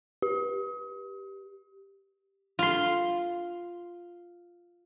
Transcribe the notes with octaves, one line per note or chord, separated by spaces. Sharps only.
G4
F4 C6